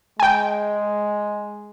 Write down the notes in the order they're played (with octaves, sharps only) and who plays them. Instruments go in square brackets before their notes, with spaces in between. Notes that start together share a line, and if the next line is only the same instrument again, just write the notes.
[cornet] G#3 [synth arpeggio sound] G5 G#5